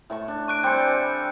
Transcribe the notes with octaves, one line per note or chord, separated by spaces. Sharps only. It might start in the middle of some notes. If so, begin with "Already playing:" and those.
A2 A5 C#6
D4
C#6 F#6 D7
G3 C4 D4 G#5 G6 C#7